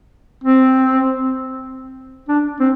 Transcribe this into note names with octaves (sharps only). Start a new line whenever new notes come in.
C4
D4
C4